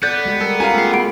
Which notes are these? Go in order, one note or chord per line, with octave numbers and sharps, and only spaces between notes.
B3 A4 D5 F#6 G6 A6
G3 G#3 G4
A4 A#4
C#4 F4 G4 F5 G#5 A#5
A3 G#4 A#4 C7
B3 F#4 F#5 B5 D7